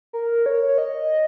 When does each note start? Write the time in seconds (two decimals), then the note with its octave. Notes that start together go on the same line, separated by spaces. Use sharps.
0.13 A#4
0.46 C#5
0.78 D#5